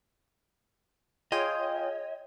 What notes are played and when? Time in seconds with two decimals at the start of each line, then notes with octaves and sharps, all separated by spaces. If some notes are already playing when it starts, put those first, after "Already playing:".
1.32 F4 G#4 C#5 D#5 G5